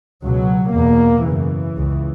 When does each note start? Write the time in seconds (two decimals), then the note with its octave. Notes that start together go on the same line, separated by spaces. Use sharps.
0.22 C#2 B2 F#3
0.74 E2 B2 A#3
1.25 F#2 C#3 E3
1.75 C#2 C#3